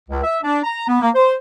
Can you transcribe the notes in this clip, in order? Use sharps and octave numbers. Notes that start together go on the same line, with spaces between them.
C#2
E5
D4
A#5
B3
A#3
C5